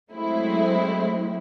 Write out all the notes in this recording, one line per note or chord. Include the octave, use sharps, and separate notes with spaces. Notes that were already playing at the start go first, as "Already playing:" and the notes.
F#3 G#3 A3 C4 E4